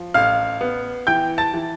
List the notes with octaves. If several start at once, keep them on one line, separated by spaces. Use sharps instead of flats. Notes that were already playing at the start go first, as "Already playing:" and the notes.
Already playing: F3
A1 F5 F6
B3
E3 G5 G6
A5 A6
E3